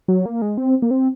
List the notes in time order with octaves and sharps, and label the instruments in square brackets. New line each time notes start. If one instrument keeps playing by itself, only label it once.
[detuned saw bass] F#3
A#3
G#3
C4
A#3
C4